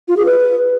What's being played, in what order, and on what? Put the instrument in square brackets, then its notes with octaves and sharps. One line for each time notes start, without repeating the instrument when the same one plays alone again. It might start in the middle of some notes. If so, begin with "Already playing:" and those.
[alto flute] F4
G#4
B4